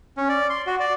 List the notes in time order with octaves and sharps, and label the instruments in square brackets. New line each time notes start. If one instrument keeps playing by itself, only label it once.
[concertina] C#4
D5
C6
F#4
D5